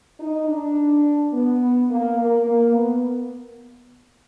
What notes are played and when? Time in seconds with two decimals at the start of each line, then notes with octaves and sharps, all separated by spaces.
0.20 D#4
0.48 D4
1.33 B3
1.90 A#3
2.18 A#3
2.47 A#3
2.74 B3